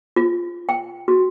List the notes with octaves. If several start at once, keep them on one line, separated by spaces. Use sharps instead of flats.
F4
G5
F#4